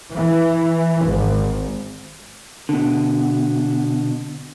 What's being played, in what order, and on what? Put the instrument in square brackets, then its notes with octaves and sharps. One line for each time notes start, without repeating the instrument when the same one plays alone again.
[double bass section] E3
G#1
[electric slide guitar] B2 D3